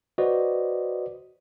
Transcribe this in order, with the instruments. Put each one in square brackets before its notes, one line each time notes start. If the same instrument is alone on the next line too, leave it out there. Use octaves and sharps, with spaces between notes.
[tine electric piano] F#4 B4 C5 D5 D#5